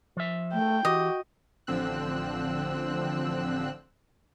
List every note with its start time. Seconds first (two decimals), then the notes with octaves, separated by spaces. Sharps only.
0.17 F3 E5
0.53 A3 G5
0.85 E3 F#4 G4 D#5
1.67 A1 D3 F3 C4 E6 F#6